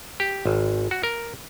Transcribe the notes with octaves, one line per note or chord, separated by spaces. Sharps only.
G4
G#1
F#4
A#4